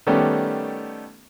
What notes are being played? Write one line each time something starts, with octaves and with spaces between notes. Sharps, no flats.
D#3 G3 A3 B3 C#4 G4